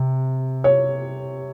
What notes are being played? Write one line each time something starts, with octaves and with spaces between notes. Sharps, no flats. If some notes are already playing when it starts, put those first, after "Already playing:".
Already playing: C3
C#5